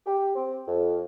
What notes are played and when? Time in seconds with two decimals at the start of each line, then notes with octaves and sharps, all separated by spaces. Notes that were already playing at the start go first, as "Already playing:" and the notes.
0.06 G4
0.35 C4
0.67 F2